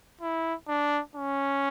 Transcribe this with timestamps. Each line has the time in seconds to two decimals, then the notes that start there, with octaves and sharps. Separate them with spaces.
0.21 E4
0.68 D4
1.15 C#4